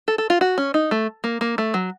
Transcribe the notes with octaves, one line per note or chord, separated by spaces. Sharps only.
A4
A4
F4
F#4
C#4
D#4
A3
A#3
A#3
A3
F#3